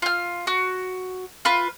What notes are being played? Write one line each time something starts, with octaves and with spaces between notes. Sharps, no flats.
F4 F6
F#4
F4 B4